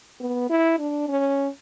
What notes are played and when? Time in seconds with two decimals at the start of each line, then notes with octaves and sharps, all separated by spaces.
0.20 B3
0.50 E4
0.79 D4
1.08 C#4